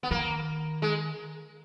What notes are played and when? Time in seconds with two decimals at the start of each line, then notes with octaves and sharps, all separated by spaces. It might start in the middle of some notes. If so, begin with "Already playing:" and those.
0.03 B3
0.11 D#3 A#3
0.82 G#3